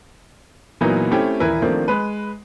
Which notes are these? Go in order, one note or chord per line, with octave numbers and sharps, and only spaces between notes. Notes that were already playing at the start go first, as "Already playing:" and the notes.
A#2 E3 F#3 A#3 B3 D#4
A3 C4 C#4 E4 G4
D#1 E3 E4 A#4 B4
D#3 F3 A3 A#3 C4 D4
G#3 B4